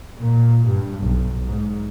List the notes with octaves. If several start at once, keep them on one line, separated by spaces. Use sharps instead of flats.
A#2
G2
B1
G#2